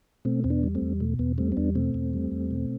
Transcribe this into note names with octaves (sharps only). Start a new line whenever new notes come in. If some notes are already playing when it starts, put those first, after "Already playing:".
B2 A3 C4
E2 C4
B3 D4
G3
A3 C4
E2
B2 A3
E2 B3
G3 A3 C4
C4
E2 B3 D4
B2 A3 C4
E2
G3
E2
B2